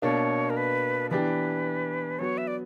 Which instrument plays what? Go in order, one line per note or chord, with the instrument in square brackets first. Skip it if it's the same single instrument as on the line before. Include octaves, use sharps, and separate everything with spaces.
[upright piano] B2 A#3 D4 [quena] C#5
[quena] A#4
B4
[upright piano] E3 B3 D4 G4 [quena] B4
[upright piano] F#3 B3 F#4 [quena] C#5
[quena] E5
D5